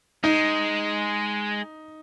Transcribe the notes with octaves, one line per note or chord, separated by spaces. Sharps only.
G#3 D#4